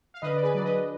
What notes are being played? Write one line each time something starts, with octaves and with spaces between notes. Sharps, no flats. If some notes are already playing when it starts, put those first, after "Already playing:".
F5
D3 B4 D#5
D5
G#4 B4
F#3 D4 D5
B4 D#5